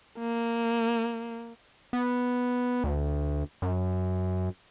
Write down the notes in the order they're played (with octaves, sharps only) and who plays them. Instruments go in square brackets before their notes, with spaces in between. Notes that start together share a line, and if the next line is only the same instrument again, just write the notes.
[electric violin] A#3
[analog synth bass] B3
D2
F#2